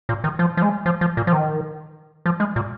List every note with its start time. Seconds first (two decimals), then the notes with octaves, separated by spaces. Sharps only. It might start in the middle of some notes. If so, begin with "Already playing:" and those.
0.09 A#2
0.24 D#3
0.39 F3
0.57 F3
0.62 G#3
0.86 F3
1.01 F3
1.17 A#2
1.27 F3
1.33 D#3
2.26 F3
2.40 G#3
2.56 A#2